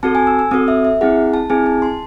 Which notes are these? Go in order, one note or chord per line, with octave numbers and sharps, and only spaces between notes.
C4 F#4 A4 A5
G#5
E6
E6
C4 F#4 A4 D#6
E5
E5
C4 E4 G#4 F#5
A5
C4 E4 G#4 G#5
A5
C6